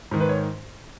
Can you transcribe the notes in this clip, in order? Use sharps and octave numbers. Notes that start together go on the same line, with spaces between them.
G#2 D#3
B4
C#5